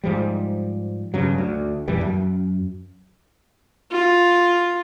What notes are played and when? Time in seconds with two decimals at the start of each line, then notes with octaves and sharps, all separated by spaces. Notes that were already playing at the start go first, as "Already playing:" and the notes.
0.04 G#2 F3 G3
1.14 G2 C#3 F#3
1.38 D2
1.88 F2 A#2 E3 G3
2.01 F#2
3.91 F4